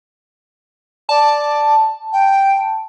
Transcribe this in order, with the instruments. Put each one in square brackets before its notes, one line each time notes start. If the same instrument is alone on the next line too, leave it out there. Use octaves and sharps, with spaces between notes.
[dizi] D5 [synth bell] A5
[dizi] G5